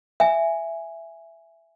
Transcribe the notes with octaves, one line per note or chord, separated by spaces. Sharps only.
E5 G#5